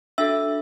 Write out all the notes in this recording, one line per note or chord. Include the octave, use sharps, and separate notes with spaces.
D4 F#4 A4 E5 E6